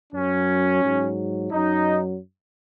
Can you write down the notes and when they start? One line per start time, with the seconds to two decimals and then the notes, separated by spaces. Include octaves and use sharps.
0.13 F#2 F#3 C#4
0.82 G#2 F#3
1.51 F#2 F#3 D#4